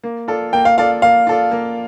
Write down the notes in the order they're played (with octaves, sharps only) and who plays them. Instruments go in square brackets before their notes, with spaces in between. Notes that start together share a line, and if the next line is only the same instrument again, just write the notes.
[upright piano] A#3
F4 A4 D5
[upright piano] A#3 [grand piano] G5
[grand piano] F5
[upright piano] F4 A4 D5 [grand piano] F5
[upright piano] A#3 [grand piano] F5
[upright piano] F4 A4 D5
A#3